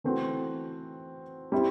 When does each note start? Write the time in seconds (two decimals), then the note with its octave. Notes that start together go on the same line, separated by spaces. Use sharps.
0.04 E3 A3 C4 F#4
1.52 G3 C4 E4 G4